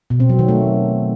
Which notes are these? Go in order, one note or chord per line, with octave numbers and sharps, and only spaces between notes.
B2
C4
F#3
D#3
A3